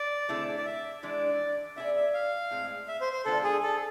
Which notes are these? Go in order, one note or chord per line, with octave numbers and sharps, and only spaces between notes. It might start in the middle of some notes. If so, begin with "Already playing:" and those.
Already playing: D5
D3 A3 C4 E4 G#4
D5
E5
E3 G#3 D4 D5
B3 E4 G#4 D5 E5
E5
F5
A2 G#3 C4 G#4
E5
C5
C5
D3 G#3 B3 D4 F4 A4
G#4
A4